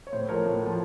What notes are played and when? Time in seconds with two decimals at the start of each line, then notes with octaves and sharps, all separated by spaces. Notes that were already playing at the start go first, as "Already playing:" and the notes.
0.07 C#5
0.12 A2 C5
0.29 F3 A3 A#4 C#5
0.45 A2
0.62 F3 A3